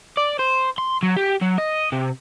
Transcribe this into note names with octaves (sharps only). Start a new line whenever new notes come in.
D5
C5
C6
F#3
G4
F#3
D#5
C3